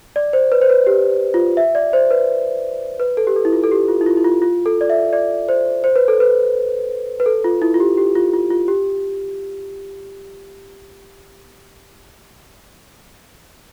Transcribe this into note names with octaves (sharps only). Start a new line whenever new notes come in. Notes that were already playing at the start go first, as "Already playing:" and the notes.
D5
C5
B4
C5
B4
G4
F4
E5
D5
C5
B4
B4
A4
G4
A4
E4
F4
A4
G4
F4
E4
F4
E4
F4
F4
A4
D5
E5
D5
C5
C5
B4
A4
B4
B4
A4
F4
E4
F4
G4
G4
F4
F4
F4
G4